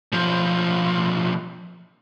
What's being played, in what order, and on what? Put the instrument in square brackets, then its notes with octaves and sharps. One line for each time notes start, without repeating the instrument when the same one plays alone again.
[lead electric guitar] B1 F3